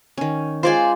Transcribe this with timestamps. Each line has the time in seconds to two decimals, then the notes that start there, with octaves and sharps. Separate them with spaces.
0.18 D#3 C#4
0.63 G#3 F4 C5 D5 G#5